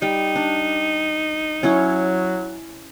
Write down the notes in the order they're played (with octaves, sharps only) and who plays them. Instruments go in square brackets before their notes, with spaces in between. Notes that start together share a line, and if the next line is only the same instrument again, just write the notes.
[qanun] G3 G5 [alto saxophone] D#4
[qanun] D4
[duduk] F#3 [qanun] C#4 E4 C#5